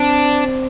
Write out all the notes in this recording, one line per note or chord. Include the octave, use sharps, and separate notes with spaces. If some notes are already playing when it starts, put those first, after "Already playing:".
Already playing: C4 D4